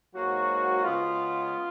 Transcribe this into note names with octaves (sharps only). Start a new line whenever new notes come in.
G#2 F#3 A#3 F#4
C#3 G#3 B3 F4